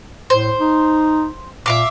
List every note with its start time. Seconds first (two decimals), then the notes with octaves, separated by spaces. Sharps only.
0.30 A2 C5
0.60 D#4
1.66 A#2 E5 F5 D6